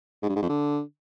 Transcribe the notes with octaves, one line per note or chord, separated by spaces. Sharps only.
G#2
G2
G#2
F2
D3